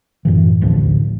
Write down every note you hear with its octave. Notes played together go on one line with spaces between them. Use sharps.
F#2 A2 E3
D#1 A1 D2 F3